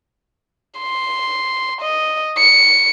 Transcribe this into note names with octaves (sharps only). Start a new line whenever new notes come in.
C6
D#5
C#7